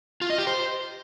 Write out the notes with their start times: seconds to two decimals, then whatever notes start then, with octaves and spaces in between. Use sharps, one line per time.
0.21 F4
0.30 D#5
0.38 G4
0.47 C5